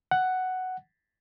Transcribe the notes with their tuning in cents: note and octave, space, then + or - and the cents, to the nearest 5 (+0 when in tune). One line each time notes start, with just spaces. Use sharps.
F#5 +5